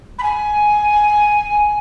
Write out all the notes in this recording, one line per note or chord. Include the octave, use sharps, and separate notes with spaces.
B5
G#5